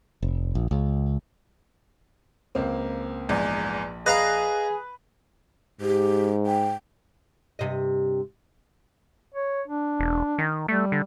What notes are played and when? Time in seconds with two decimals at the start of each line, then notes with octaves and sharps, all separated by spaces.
0.23 F1
0.55 A#1
0.71 C#2
2.55 C#2 A#3 C4
3.29 A#1 E2 G#2 D5
4.06 G#4 B4 D#5 F5 A#5 F#6
5.81 G#2 G4
6.46 G5
7.59 G2 C3 D#5
9.34 C#5
9.68 D4
9.99 E1
10.38 D#3
10.68 G3 A3
10.92 D3